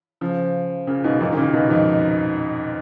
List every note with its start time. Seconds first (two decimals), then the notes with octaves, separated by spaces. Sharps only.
0.21 C#3 F3
0.87 A#2 C#3
1.04 G#2 B2
1.21 F#2 A#2
1.32 D#3
1.37 A#2 C#3
1.53 G#2 B2
1.70 F2 G#2